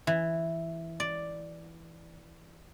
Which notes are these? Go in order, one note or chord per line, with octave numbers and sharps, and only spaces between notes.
E3
D5